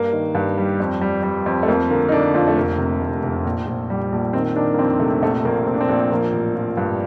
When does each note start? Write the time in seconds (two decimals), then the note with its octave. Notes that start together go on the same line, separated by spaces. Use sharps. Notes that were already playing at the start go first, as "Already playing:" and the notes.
Already playing: G2 A#3
0.13 D#3
0.35 G2
0.58 G3
0.80 F2
1.01 G3
1.23 G3
1.46 F2
1.63 A3
1.68 F2 A#3
1.90 D3 A#3
2.09 D#4
2.12 D3 D4
2.34 F2 F4
2.48 A3
2.57 F1 A#3
2.78 C3
3.01 F1
3.23 F1
3.45 A#1
3.67 A#1
3.90 G3
4.12 A#1
4.33 D#3 C4
4.56 D#3 D4
4.74 A#3
4.79 F2 C4
5.00 C3 A3
5.22 A#1 A3
5.45 A#1 A#3
5.67 A#1 C4
5.74 D4
5.81 C4
5.88 A#1 D4
6.11 F3 A#3
6.33 A1
6.56 F3
6.77 G2